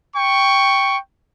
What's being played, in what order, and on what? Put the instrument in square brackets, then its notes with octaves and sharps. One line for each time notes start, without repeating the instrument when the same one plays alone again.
[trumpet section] G5 C#6